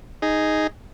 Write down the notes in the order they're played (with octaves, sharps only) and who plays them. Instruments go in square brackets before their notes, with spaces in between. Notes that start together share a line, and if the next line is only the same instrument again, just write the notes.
[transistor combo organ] D#4 G#4